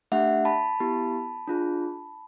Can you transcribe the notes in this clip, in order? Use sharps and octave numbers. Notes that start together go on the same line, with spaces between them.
A3 D4 G4 E5 F#5
A5 B5
B3 E4 G4
D4 F4 G#4